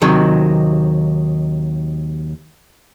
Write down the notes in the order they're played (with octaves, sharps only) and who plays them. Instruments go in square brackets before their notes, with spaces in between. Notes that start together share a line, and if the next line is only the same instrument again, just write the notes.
[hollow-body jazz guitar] D#2 C3 D#3 F#3